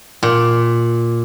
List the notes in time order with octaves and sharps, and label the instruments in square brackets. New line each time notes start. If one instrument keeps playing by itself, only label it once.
[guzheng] A#2